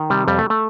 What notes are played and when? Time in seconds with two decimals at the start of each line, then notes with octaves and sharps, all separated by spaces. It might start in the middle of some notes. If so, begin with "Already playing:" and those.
Already playing: D#3
0.10 C3 G3
0.27 F2 G3
0.39 A3
0.50 A3